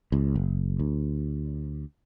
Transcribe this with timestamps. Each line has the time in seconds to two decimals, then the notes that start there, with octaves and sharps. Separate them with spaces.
0.12 C#2
0.35 F#1
0.79 D2